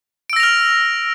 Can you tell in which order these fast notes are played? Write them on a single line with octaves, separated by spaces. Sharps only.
D7 E6 A#6 F7 F6